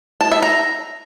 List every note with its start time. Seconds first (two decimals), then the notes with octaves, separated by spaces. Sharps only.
0.21 A5
0.32 E5
0.42 A#5